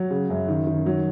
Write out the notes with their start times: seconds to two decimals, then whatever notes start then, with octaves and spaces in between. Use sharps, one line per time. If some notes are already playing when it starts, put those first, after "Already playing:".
Already playing: F#3
0.11 C#3
0.30 F#2
0.48 D#3
0.67 D#3
0.86 F#3